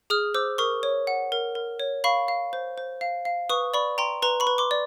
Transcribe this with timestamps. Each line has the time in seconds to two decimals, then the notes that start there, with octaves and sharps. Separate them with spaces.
0.10 G#4 D#6 F6
0.34 C5 D6 E6
0.58 A#4 C#6 D#6
0.83 C#5
1.07 F#5
1.32 A#4
1.55 A#4
1.80 C#5
2.04 F5 B5 C#6
2.28 F5
2.53 C5
2.78 C5
3.01 F5
3.25 F5
3.50 B4 C#6 D#6
3.74 D5 B5 C#6
3.98 G5 A#5 C6
4.22 B4 A#5 C6
4.40 B5 C#6
4.47 B4
4.58 C6 D6
4.71 D5